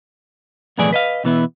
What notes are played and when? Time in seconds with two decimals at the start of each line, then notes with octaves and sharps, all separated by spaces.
0.78 B1 F2 A2 E3 G#4 D5
0.93 B4 D#5 F5
1.24 B2 E3 B3 E4